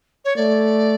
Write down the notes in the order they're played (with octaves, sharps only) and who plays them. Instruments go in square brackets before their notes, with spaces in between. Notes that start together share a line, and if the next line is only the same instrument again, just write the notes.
[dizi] C#5
[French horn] A3 [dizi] D5